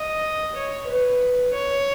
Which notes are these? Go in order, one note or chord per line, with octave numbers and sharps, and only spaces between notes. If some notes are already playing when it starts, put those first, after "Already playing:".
Already playing: D#5
C#5
B4
C#5